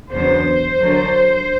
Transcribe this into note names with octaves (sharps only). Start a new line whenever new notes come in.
E2 C#3 F#3 B3 D4 C5
D3 F#3 A#3 D4